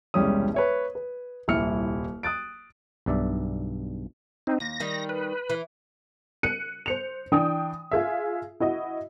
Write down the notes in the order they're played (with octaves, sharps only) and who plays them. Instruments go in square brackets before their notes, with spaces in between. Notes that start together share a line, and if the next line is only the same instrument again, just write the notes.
[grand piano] E1 C2 G3 G#3 C#4 D#6
B4 C#5 E5
B4
D#1 C2 E4 F6 C#7
D#6 F#6 A6 D7
[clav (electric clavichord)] B1 G2 D5 E5
[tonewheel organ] C4 D#4
[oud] D#2 [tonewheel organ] A#6
[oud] D#3 G3
[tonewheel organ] B4
[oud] E3
[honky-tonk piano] F#6 C#7 D#7
C5 C#7 F7
E3 D4 G5 D#6
F4 G#4 E5
E4 F#4 D#5